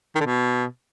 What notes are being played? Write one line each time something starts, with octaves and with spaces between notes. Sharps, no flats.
D#3
D3
B2